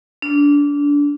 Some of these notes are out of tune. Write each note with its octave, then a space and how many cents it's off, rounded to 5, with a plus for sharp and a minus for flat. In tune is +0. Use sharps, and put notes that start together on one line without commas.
D4 -25